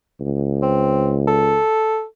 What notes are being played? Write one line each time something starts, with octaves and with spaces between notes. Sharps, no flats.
C#2
C4
A4